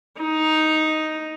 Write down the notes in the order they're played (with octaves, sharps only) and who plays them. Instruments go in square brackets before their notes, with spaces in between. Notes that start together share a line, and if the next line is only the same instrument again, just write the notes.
[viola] D#4